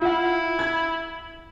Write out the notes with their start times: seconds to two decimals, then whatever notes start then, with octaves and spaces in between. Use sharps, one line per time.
0.01 E4 F4 F#5
0.59 B5 G#6